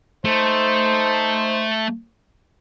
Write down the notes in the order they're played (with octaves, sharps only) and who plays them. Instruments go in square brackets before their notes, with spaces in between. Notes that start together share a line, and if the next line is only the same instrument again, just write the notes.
[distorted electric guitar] A3 [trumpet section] D#4 C5